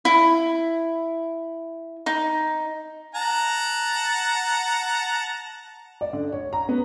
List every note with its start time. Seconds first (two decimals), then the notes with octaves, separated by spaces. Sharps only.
0.05 E4
2.06 D#4
3.15 F#5 A5 A#5
6.01 D5
6.13 D3
6.32 C#5
6.53 A#5
6.69 B3